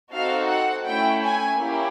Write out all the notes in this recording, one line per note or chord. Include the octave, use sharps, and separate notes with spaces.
C4 D#4 F#4 A4 F5
F#5
A3 C#4 E4 G5
G#5
A#3 C#4 E4 G4